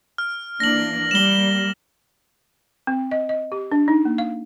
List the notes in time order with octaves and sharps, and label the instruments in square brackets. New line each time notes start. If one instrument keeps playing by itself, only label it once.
[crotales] F6
[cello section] E3 A#3 D4 [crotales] A#6 F#7
[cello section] G3 A#3 [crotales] E7 G7
[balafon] C4
D#5
D#5
G4
D4
D#4
A#3
F5